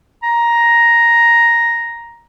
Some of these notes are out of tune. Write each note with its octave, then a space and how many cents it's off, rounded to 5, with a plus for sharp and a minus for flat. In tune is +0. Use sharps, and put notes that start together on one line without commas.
A#5 +5